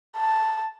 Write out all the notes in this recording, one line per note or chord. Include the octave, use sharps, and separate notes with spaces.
A5